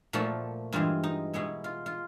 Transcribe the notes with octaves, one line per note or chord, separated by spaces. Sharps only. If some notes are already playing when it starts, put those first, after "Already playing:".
A#2 F3 A3 F#4
G2 E3 G#3 F4
D#4
B2 G#3 B3 E4
F4
F4